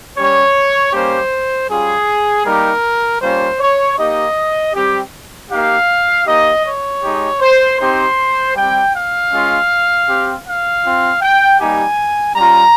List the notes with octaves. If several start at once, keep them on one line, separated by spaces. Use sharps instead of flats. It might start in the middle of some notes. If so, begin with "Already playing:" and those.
G3 C#4 G4 C#5
G3 A#3 C#4 G4 C5
G3 C#4 F4 G#4
G3 A#3 D#4 G4 A#4
G3 A#3 C#4 F4 C5
C#5
A#3 D#4 G4 D#5
G3 C4 G4
A#3 D#4 G4 F5
A#3 D#4 G4 D#5
C#5
G#3 D#4 G4
C5
C4 D#4 G4 C5
G3 C4 G4 G5
F5
G#3 C#4 F4
C4 G4
F5
C4 F4
G5
G3 A#3 D#4 G4 G#5
G3 C#4 F4 A#5